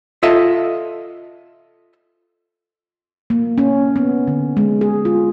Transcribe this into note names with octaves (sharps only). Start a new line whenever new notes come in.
F4 A4 D#5 E5
A#3
C#4
B3
D3
G#3
G#4
F4